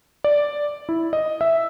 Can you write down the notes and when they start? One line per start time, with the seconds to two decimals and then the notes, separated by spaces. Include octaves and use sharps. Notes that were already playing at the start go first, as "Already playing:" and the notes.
0.24 D5
0.89 E4
1.13 D#5
1.41 E5